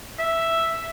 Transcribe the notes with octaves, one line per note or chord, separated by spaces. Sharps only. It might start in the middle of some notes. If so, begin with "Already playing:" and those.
E5